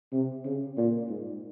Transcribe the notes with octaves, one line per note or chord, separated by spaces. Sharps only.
C3
C#3
A#2
G#2